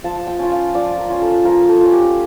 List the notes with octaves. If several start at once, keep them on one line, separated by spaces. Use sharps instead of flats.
F3 A5
G5
C#4 F4
F5
F3 D5
A#4
C#4 F4
A4
F3 A#4
A4
C#4 F4
G4